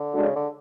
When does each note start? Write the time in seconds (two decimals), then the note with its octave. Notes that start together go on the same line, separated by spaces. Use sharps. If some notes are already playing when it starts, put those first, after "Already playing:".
Already playing: D3
0.14 G#3 D4 F#4 A4 D5
0.23 C#3
0.35 D3